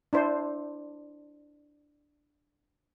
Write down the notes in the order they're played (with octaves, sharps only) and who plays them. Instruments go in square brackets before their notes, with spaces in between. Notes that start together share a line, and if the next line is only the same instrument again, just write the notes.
[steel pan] D4 E4 C5